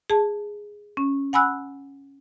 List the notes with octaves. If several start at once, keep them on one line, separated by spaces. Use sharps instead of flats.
G#4 A5
C#4
F#5 G#5 B5 E6 F#6